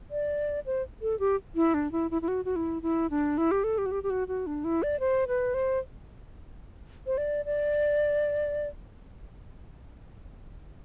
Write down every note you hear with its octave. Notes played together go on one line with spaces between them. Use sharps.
D5
C5
A4
G4
E4
D4
E4
E4
E4
F#4
F#4
E4
E4
D4
E4
G4
A4
G4
F#4
G4
G4
F#4
F#4
D4
E4
D5
C5
B4
C5
C5
D5
D5